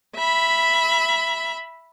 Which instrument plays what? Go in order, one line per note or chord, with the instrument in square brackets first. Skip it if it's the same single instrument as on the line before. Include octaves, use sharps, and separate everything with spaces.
[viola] E5 B5